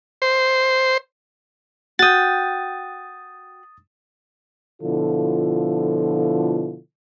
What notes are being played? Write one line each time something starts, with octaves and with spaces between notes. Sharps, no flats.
C5
F#4 G5 D#6 A6
B2 D3 F3 E4 F4 A4